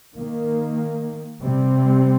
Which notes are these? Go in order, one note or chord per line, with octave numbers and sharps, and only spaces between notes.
D#3 A#3
C3 G3 C4